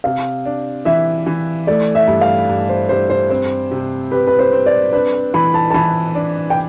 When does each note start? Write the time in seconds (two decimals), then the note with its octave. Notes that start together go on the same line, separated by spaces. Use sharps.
0.04 C3 F5
0.45 D4
0.85 E3 E5
1.26 E3
1.67 A3 D5
1.95 E5
2.07 G2
2.21 F5
2.49 G2
2.69 C5
2.89 G2 C5
3.10 C5
3.30 C4 C5
3.71 C3
4.11 G4 B4
4.27 B4
4.39 C5
4.53 C4
4.66 D5
4.93 D4 B4
5.34 E3 B5
5.54 A5
5.71 A5
5.74 E3 B5
6.15 D4
6.50 G5